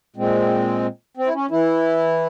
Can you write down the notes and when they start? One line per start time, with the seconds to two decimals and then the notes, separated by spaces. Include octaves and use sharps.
0.16 A#2 G#3 C4
1.17 C4
1.26 E4
1.34 C#4
1.51 E3 E4